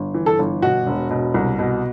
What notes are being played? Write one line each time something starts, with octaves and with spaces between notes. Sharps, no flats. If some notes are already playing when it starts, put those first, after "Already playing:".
Already playing: G1
E3
A4
G1
B2 F#4
E1
B2
C2
B2